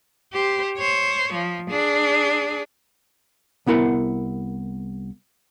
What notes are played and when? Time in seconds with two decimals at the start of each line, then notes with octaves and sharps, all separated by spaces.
0.33 G4 C5
0.78 C5 C#5
1.33 F3
1.70 D4 G#4
3.66 C2 B3 E4 A#4 F#5